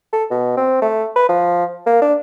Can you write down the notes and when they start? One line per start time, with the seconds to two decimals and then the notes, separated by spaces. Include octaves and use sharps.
0.13 A4
0.31 B2
0.57 C4
0.82 A3
1.16 B4
1.29 F3
1.86 A#3
2.02 D4